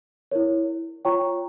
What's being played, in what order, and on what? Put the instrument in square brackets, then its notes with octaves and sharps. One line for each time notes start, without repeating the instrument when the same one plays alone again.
[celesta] E4 A#4 C#5
F4 C#5 G5 A#5 C#6